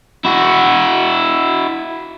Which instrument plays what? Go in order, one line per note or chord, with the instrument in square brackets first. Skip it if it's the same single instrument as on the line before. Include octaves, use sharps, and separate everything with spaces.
[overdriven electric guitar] E4 F#4